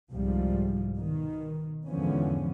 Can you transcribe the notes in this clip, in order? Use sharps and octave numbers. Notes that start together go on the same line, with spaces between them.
C2 G#2 F3 G3
B2 D#3
E2 G#2 D3 F3 B3 C#4